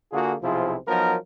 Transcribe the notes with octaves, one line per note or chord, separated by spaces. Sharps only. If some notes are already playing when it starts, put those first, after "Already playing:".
D3 A#3 F4 F#4 G#4
B1 C3 F3 E4 F4 G#4
F3 F#3 B3 D#4 A#4